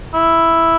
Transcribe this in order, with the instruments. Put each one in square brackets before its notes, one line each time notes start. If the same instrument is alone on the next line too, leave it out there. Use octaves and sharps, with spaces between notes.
[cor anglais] E4